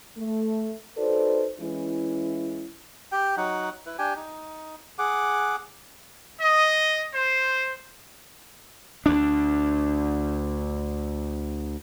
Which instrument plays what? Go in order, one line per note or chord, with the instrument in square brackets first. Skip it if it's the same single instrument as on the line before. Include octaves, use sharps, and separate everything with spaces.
[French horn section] A3
D#4 F#4 A4 B4 C5 D5
E3 G#3 C#4 E4
[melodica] G4 G5
F#3 D#4 F#5
E4 B4
D4 G4 G5 G#5
D#4
G#4 F#5 D6
[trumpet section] D#5
C5
[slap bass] D2 D4